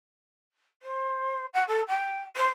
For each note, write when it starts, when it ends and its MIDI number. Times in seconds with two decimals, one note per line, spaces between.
0.82 1.45 72
1.53 1.63 78
1.67 1.81 69
1.88 2.20 79
2.36 2.47 72